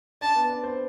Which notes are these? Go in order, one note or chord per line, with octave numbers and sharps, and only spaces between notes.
D4 D5 A5
B3 B4
D4 D5
C4 C5